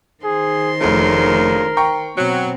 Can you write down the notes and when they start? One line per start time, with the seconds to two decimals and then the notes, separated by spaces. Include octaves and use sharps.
0.24 D#3 G#4 C5 C6
0.81 F1 D2 A#2 C#3 A3 A#4
1.77 G5 A#5 C#6
2.18 B2 F#3 C4